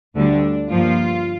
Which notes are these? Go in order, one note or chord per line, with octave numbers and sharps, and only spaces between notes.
D2 D3 G3 D4
G2 F3 A#3 F4